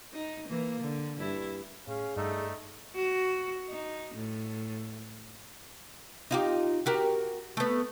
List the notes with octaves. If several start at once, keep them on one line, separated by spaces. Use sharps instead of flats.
D#4
E3 A#3
D3
G2 E4
A2 C#4 G#4 F5
G2 A3 D#4 D5 E6
F#4
D#4
A2
D#4 F4 G4
F#4 G4 A#4
A3 B3